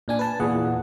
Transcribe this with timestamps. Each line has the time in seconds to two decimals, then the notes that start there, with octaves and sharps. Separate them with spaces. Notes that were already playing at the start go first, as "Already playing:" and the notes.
0.08 A#2 D4 G#5
0.19 B4 A5
0.40 E2 A#2 E3 G#4 F#5